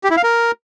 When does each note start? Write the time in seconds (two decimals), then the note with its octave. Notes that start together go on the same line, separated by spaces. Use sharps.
0.04 G4
0.11 E4
0.17 F5
0.24 A#4